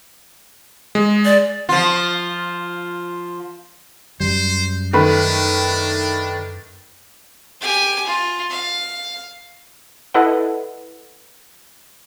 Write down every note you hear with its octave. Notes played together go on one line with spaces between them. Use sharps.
G#3
D5
F3 F4
F#2 G3 C5
D#3 A3 D4 B4
G4 G#5
F4
F5
E4 A4 B4 D#5 F#5